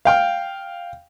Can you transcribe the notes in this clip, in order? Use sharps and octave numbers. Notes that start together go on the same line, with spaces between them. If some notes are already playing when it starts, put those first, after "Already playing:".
F5 G5 F6